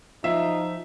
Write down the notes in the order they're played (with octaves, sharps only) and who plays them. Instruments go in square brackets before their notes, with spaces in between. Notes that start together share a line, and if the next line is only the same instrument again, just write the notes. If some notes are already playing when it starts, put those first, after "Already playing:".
[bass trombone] F3 [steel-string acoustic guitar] F#3 F4 F5 [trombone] D#4 [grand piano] E5